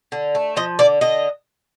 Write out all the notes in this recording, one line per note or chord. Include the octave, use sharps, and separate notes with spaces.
D3
A3
F3 D#5
D3 D5
D3 D#5